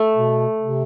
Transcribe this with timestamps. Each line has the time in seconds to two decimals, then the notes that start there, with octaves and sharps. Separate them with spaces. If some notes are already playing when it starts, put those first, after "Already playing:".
Already playing: A3
0.15 B2
0.60 C3